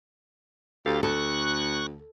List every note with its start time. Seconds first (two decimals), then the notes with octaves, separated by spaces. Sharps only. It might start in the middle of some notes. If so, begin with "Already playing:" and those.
0.86 D2 G4 A4 F5
1.03 D2 A4 C#6 F#6